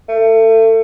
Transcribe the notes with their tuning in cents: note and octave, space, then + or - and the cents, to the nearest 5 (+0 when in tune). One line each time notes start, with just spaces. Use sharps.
A3 +30